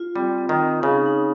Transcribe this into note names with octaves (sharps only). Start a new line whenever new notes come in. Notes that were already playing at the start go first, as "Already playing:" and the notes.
Already playing: F4
G3 C4
C4
D#3
C4
C#3 D#4
D#4